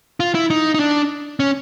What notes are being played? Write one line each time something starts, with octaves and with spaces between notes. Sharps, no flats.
F4
E4
D#4
D#4
D4
C#4